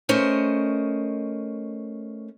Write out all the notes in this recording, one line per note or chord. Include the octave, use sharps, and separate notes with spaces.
A3 C#4 A#4 C5 D#5